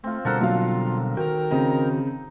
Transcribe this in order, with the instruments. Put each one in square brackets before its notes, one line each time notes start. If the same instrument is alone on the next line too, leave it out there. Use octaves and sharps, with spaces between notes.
[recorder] A3 [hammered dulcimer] C4 F4
[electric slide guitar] B2 D3 G3 [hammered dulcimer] A4 A#4 F#5 [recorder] C5
[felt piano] B1 F5 [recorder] F4
[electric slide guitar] D#3 F#4 [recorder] A#4 [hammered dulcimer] G5
[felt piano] C#3 C4 [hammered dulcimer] D#4